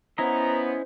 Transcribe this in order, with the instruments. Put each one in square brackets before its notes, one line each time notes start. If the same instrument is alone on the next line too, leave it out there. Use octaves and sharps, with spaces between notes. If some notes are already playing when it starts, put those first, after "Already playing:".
[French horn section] B3 [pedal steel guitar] C#4 E4 D#5 [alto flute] C5 [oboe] A#5